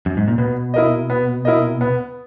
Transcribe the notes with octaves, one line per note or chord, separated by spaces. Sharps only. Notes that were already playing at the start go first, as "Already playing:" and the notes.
F#2
G#2
A#2
B2 B3
E4 A#4 D#5
B3
E4 A#4 D#5
B3